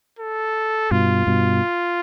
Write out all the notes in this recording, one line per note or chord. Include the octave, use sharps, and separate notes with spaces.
A4
G2 B2 F4
G2 B2